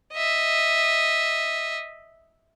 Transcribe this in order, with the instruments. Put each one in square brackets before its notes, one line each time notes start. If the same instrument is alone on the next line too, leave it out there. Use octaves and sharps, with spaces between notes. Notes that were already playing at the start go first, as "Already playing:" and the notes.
[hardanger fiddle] D#5 E5